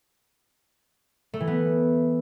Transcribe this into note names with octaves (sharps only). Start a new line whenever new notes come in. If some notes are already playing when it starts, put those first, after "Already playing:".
A3
E3
B3